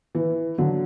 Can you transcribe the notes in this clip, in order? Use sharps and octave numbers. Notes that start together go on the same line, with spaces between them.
E3
D3 F#3